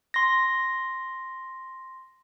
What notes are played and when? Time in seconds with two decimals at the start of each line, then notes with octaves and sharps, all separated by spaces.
0.14 C6 A#6